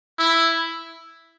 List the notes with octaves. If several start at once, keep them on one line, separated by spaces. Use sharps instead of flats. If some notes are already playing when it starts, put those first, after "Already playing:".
E4